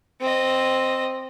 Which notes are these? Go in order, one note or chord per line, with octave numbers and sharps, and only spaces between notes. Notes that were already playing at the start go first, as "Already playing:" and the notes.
C4 D#5